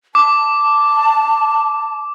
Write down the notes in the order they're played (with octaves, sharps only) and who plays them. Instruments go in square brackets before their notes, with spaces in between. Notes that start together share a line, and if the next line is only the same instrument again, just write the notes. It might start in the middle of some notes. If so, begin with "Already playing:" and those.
[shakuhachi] A5 [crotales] D6